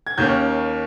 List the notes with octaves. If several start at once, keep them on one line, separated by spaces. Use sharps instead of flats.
G#6
D#2 D#3 A#3 C#4 G6